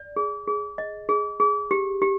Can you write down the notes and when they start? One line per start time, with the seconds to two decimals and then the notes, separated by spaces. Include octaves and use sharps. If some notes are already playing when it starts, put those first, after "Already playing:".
Already playing: D5
0.16 G#4
0.47 G#4
0.78 D#5
1.09 G#4
1.40 G#4
1.71 G4
2.02 G4